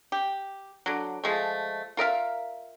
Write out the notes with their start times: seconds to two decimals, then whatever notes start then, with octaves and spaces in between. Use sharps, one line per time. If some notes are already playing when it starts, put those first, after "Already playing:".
0.12 G4
0.86 D3 F#3
1.24 F3 G#3 A3
1.97 F4 A#4 E5 F5